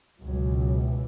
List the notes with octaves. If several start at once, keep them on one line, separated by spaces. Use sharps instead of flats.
C#2 B2 F#3
E3